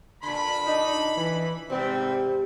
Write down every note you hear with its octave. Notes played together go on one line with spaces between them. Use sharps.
A#2 D3 B5
D4 D#4
E3
G#2 C3 G3 C4